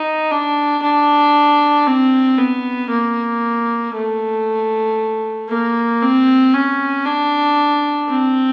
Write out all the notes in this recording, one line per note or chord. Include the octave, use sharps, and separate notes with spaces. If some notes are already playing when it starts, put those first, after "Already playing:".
Already playing: D#4
D4
D4
C4
B3
A#3
A3
A#3
C4
C#4
D4
C4